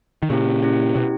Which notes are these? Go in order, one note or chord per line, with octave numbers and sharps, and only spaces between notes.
D#3
A#2 C#3 C#4 E4 G4
C#4 E4 G4
B2 C#4 E4 G4